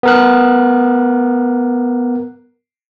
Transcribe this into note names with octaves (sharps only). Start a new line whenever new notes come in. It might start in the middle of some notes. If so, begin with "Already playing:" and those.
B3 A#4 F#6